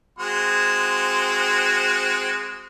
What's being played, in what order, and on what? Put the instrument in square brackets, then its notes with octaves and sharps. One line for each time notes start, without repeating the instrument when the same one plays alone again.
[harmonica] G#3 C4 F#4